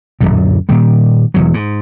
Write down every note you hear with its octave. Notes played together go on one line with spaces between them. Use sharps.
D1 G1 F#2 A#2
A#2 D#3 G3
E1 E2 F#3
G#2